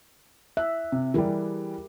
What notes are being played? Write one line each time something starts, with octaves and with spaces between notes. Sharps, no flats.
E5 F#6
C3
E3 G3 G4 G#4 A#4